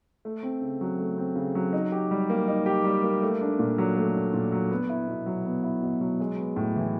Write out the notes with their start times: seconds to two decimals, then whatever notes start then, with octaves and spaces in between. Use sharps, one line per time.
0.25 A3
0.43 C4
0.61 C#3
0.81 F#3
0.98 A3
1.18 C4
1.36 C#3
1.55 F#3
1.73 D#4
1.92 G4
2.11 G3
2.30 A#3
2.48 D#4
2.66 G4
2.84 G3
3.03 A#3
3.22 A3
3.41 D4
3.59 A#2
3.78 F#3
3.97 A3
4.15 D4
4.34 A#2
4.52 F#3
4.71 B3
4.89 E4
5.08 B2
5.26 F#3
5.45 B3
5.64 E4
5.83 B2
6.01 F#3
6.20 G#3
6.38 B3
6.56 A2
6.76 E3